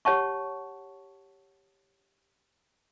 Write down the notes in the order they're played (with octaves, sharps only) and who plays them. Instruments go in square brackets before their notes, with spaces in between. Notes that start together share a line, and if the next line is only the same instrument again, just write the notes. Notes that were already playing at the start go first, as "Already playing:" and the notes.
[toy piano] G4 C#5 F#5 A5 C#6